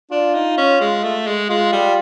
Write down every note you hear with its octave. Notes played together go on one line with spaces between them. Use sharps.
D4 F4
D#4
C#4
G#3
A3
G#3
G#3 F4
G3